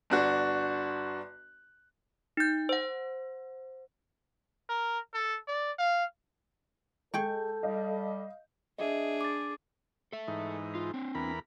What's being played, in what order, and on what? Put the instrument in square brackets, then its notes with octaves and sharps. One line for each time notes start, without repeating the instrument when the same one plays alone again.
[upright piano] G1 D4 F#4
[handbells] D#4 G6
C5 F#5
[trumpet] A#4
A4
D5
F5
[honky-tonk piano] G#3 G6 [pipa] G#4 G5 C#6 [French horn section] A4
[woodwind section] G3 [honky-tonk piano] D#5 F5
[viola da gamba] D4 G#4 [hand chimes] D#5 E5
[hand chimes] D6 A6
[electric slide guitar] A4 E5
[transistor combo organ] G#2 E3 D#4
[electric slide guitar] F4
C4 D4
[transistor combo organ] E2 A#4 B5